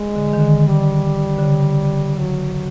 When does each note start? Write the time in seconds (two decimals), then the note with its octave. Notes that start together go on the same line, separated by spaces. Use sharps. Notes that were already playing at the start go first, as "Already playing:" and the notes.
Already playing: G#3
0.16 D3
0.33 D#3
0.40 D3
0.67 G3
1.38 D3
1.43 C#3
2.18 F#3